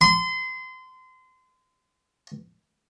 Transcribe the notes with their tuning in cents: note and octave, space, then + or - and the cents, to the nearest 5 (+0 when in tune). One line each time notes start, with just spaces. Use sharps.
C6 -30